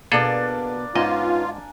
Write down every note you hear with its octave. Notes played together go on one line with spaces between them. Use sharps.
B2 A#3 B3 D4 G#4 A4 D5
G#2 B3 C#4 D#4 F4 D#5 G#5